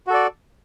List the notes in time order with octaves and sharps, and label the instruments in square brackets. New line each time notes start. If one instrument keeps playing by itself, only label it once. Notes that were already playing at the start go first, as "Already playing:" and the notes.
[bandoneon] F#4
A4
D5